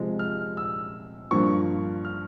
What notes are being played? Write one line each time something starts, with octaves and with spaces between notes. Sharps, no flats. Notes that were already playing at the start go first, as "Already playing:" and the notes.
Already playing: C3 F3 G#3
F6
E6
G2 F3 A#3 C#6
F6